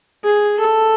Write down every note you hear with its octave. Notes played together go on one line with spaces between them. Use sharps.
G#4
A4